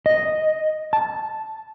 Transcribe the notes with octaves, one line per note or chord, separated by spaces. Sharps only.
D#5
A5